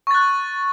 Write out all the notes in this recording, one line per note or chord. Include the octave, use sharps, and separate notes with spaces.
C#6 F#6 A6